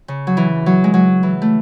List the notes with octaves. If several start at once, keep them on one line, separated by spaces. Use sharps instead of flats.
C#3
F#3
E3
F#3
G#3
F#3
E3
A3